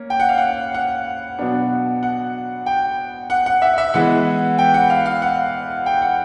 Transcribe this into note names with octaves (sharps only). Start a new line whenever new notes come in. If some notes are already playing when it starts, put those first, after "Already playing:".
Already playing: A#3 C#4
G5
F#5
F5
F#5
F#5
B2 F#3 B3 D4
F#5
G5
F#5
F#5
E5
E5
E3 G#3 B3 F#5
G5
F#5
F5
F5
F#5
G5
F#5